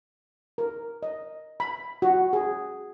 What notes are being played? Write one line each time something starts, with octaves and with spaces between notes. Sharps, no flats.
A#4
D#5
B5
F#4
G#4